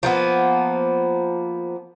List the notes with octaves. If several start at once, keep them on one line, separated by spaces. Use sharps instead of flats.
F3 A#3 B3